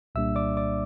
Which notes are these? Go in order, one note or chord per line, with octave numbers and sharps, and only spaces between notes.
C2 A#2 G3 A#3 D4 E5 E6
D5 D6
D5 D6